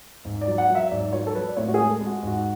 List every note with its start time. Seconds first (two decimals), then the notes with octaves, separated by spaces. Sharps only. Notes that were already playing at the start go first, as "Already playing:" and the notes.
0.25 G#2
0.41 D5
0.47 F#3
0.58 F#5
0.70 F#3
0.75 E5
0.91 G#2 D5
1.13 F#3 C#5
1.27 A4
1.35 F#3 B4
1.48 D5
1.57 A2 C#5
1.68 F#4
1.74 G#3 G#4
1.90 A4
2.01 G#3
2.06 F#4
2.23 G#2 F#4